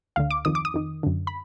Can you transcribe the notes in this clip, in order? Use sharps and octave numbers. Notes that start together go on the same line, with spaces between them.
D2 D3 F5
D6
F2 D#3 D#6
D6
D#6
F2 D#3
F#2 D3
B5